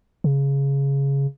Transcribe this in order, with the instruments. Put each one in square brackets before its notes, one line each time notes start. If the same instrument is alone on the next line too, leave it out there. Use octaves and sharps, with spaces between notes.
[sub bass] C#3